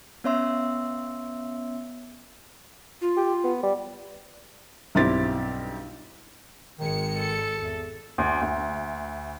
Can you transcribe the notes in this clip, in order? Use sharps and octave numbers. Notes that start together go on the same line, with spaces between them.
B3 C#4 C#5 E5 C6 E6
F4
G4
B3
G3
B1 G2 C4 E4 G4 A6
G#1 D#3 G#3 C#7
A4
E2
D2
D2